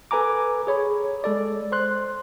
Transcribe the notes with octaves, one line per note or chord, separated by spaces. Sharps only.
A4 B4 G#5 A#5 D6
G#4 C#5 B5
G#3 A4 D5
C5 C6 F#6